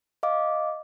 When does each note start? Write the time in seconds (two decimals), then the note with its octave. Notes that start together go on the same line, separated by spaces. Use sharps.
0.23 D#5 F5 D6